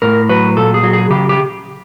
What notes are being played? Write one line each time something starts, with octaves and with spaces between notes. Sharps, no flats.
A2 A#4
F#3 B4
A#2 A4
G#4
F#3
G#4
C#3 G4
G4